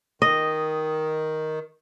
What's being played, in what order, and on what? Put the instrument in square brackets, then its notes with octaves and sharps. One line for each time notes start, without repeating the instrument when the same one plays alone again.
[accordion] D#3 [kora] D#5